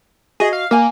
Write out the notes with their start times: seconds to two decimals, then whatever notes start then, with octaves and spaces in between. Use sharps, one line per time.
0.40 F#4 G#4 D#5
0.53 F5
0.71 A#3 F5 G#5